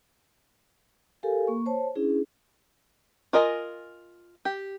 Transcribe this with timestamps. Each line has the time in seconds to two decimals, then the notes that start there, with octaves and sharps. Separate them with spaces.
1.23 G4 A4 A#4 F5 G#5
1.47 A#3 C#6
1.66 C5 C#5 A5
1.96 C#4 D4 E4 G#4
3.33 F4 A#4 D#5 G#5
4.45 G4